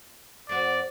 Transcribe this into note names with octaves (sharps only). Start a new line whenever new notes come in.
F2 C4 F#4 D5